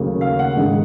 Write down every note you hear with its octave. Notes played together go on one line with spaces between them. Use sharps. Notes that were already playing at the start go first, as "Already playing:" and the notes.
Already playing: D#2 C#3 F#3 A3
F5
F#5
G#2 D#3 G#3